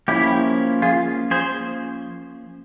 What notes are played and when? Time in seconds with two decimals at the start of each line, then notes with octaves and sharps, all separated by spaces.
0.08 F3 A#3 C#4 E4 G4
0.82 F4 G#4
1.31 G#4 C5